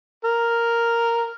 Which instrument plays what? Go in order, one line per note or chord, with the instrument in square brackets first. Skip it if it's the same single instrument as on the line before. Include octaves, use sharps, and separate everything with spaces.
[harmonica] A#4